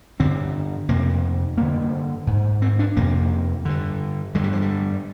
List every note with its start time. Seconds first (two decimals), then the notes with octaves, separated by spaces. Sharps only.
0.20 G2 D3 C4
0.89 F2 C3 A#3
1.58 G2 D3 A#3
2.27 G#2
2.62 C4
2.79 D4
2.97 F2 C3 A#3
3.65 G2 D3
4.35 G2 D3 G#3
4.44 G3
4.53 F3
4.62 G3